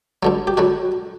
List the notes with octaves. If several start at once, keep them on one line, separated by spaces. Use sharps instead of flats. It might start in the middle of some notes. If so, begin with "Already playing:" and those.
G2 D3 F#3
G4
D3 F#3 F#4